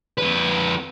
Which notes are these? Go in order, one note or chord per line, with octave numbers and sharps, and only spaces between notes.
F2 B4